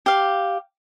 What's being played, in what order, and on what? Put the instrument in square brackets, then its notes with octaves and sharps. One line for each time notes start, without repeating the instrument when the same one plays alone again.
[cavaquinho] G4 F5